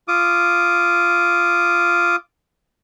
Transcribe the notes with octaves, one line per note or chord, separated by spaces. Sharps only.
F4 D6 D#6